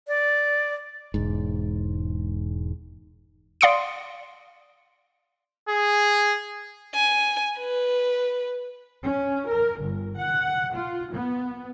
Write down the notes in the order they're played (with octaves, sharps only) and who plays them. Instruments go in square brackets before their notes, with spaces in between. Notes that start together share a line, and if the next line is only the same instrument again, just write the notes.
[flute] D5
[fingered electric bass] E1 G#2
[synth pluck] D5 F5 C6 D#6 C#7 D7
[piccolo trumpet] G#4
[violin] G#5
B4
[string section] C#4
A#4
G1
F#5
F4
B3